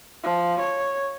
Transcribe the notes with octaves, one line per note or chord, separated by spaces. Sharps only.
F3
C#5